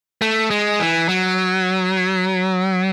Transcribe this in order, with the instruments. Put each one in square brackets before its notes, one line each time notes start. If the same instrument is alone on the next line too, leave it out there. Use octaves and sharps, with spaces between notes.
[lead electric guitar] A3
G#3
E3
F#3